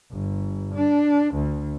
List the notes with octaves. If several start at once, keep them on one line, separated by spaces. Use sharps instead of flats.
G1
D4
D2